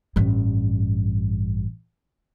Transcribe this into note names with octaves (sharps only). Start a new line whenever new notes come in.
A1 G2